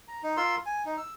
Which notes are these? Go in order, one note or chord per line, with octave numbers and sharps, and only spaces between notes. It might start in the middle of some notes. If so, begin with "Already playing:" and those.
A#5
D#4
F4 A#4 C6 E6
G#5
D#4
E6